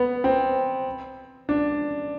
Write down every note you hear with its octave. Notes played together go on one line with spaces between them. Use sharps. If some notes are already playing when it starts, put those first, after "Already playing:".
Already playing: B3
C4
D4